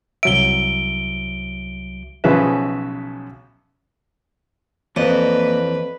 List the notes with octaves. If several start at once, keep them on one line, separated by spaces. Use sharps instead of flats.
C2 F#3 E5 D7 G7
B1 C#3 F3 G#4 B4 E5
F2 E3 A#3 B4 D5 D#5